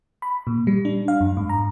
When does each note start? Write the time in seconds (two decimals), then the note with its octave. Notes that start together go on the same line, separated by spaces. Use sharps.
0.22 B5
0.47 A#2
0.67 G3
0.85 D4
1.08 F5
1.21 F#2
1.37 G#2
1.49 A#5